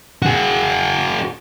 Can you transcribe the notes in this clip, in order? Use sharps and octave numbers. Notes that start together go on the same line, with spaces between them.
F#4 G#4